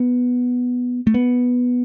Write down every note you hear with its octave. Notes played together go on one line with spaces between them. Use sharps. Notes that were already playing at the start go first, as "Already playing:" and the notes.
Already playing: B3
A3
B3